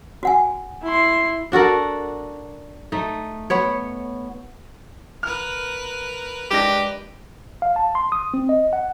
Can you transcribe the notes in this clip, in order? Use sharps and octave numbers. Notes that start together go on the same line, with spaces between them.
F#4 F#5 G#5
E4 C6
D4 F#4 A4 A#4
A3 D#4
B3 C#5
A#4 B4 F6
G#3 D4 G4 A#6
F5
A5
C6
D#6
C4
D#5
F#5